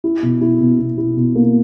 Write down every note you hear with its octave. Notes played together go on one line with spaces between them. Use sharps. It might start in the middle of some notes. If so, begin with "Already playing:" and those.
E4
B2
E4
B2
B2
E4
B2
A#3